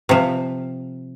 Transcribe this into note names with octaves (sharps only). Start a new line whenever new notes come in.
C3 F3